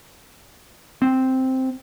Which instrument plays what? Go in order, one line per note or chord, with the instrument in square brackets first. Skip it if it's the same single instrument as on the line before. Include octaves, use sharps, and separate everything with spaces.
[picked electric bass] C4